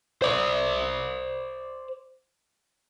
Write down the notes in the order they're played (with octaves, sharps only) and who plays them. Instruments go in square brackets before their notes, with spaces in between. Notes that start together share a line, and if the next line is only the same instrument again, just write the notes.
[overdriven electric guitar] C5 D5